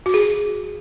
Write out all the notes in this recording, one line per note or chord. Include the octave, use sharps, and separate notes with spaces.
F#4
G#4